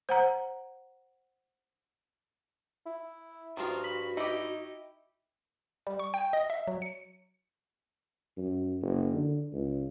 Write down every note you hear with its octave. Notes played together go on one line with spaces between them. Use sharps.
C5 F#5 A#5
E4
G2 D#3 F3 F4 F#4
B5
D#4 E4 G4
G3
C#6
G5
D#5
E5
F#3
C#7
F#2
F#1
D3
C#2